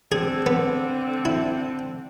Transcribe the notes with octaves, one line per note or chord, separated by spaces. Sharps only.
D3 C4 G#4
B3
E4